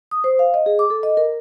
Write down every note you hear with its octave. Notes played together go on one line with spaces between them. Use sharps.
D#6
C5
F5
D#5
G#4
D6
A4
D#5
A#4